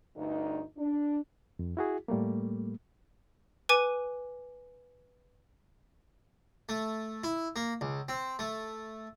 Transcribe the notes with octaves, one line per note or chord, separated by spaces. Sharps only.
D2 G2 D#4
D4
F2
E4 F#4 G#4
A2 G3 A3 A#3
B4 G#5 D6 D#7
A3
E4
A#3
C#2
C4
A3